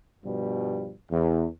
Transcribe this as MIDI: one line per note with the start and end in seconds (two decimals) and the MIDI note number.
0.24 0.94 43
0.24 0.94 47
0.24 0.94 53
0.24 0.94 55
1.12 1.47 40